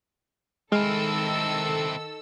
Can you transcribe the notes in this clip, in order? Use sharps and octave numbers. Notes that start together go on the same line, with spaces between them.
D#3 G#3 C4 E4 A4 E6 F6